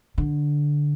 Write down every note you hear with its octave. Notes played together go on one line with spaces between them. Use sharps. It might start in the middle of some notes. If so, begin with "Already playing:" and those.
D3